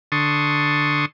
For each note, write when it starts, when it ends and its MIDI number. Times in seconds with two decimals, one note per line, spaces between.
0.12 1.06 50
0.12 1.06 81
0.12 1.06 84
0.12 1.06 85
0.12 1.06 87